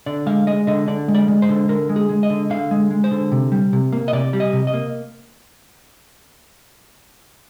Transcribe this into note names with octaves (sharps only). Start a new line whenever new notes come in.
D3 D5
G#3 F5
G#3 D#5
D3 D#5
D3 D5
G#3
D5
G#3
C5
D3
D3 A#4
G#3
G#4
G#3
D#5
D3
D3 F5
G#3
G#3
C5
D3
C3
G3
C3
A#3
D#5
C3 D5
G3
D#5
C3
D#5
A#3